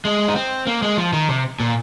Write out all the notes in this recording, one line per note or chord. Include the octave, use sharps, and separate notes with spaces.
G#3
D#4
C4
A#3
G#3
F3
D#3
C3
A#2